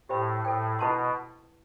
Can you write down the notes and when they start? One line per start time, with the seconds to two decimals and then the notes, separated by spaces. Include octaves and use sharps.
0.09 A2 G4 C5 E5 G5 B5
0.45 A2 A4 C5 G5
0.79 B2 E4 B4 F#5 A5 C6